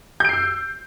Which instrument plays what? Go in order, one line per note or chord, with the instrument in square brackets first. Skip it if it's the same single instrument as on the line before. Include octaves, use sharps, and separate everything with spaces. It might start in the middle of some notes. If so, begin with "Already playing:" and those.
[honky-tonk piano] G6
D7
C7
E6